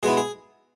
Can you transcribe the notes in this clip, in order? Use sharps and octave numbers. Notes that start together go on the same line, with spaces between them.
B2 G#3 B3 E4 G#4
G#4